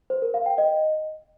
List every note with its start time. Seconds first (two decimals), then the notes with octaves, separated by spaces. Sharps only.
0.10 C5
0.22 A#4
0.34 F5
0.46 G5
0.58 D#5